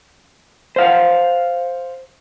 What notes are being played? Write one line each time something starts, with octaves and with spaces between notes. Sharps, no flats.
C5 F5 F#5